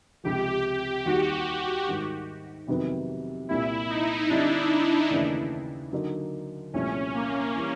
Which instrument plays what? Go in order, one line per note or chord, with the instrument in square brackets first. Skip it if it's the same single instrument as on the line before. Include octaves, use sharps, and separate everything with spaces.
[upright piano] C#2 C3 F3 [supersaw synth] G4
[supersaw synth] G4
[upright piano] D#2 D#3 G3 [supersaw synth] F#4
[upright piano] G#2 D#3 G3
F2 C3 D#3 F#3 B3
[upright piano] C2 A#2 G3 [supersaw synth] E4
[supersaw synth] D#4
[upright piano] D3 G3 C4 [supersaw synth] D4
[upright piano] D#2 C#3 E3 A3 D4
D3 F#3 A#3 D#4
[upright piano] C2 A#2 F3 A3 [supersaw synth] C#4
[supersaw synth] A#3
[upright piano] E3 G3 A#3